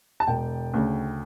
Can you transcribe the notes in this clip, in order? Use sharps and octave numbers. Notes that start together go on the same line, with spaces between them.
A5
E1 G5
D2 C#3